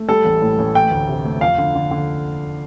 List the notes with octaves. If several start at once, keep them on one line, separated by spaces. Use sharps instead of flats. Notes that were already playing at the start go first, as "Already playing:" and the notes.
Already playing: A3
G3 A4
A1
A2
A1
A3 G5
D2
C3
A3
F2 F5
D3
D3
D3